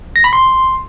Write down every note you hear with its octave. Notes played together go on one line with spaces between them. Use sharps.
A#6
B5
C6